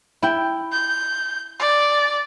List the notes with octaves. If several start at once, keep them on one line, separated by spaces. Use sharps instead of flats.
E4 G5
G6
D5